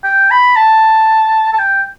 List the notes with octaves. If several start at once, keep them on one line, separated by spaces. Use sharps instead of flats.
G5
B5
A5
A5
G5